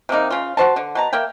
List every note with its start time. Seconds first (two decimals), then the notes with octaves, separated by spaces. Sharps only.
0.09 C3 G3 A#3 D#4
0.30 C#3 F4
0.57 F#4 C5 A5
0.76 D3
0.95 B2 A5 A#5
1.13 A#3 E5 G5